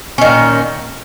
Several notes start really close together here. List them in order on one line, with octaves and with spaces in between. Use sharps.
C#4 D#3 A#2